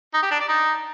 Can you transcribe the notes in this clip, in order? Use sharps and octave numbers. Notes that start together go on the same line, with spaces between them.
D#4
G4
D4
D5
D#4